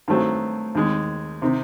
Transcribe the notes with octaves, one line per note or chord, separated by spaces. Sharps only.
G2 D#3 F#3 A3 C4
D#2 D#3 G#3
C3 D#3